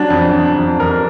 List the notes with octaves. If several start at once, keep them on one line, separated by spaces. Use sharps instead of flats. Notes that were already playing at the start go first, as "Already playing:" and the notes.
Already playing: F#3 D4
F2
F2
F2
F2 A#4